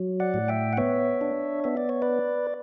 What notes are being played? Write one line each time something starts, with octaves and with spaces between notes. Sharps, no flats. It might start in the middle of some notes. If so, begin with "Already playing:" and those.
Already playing: F#3
D5 F#5
A2
E5 G5
F#5
B3 C#5 E5
D4
B3 E5
D5
C#5
B4 D5